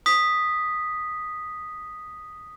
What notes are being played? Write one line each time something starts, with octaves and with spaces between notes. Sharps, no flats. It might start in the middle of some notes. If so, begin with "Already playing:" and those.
D#6 B6